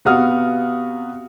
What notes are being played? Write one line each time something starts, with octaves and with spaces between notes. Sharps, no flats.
C3 B3 F#4 F5 D#6 F6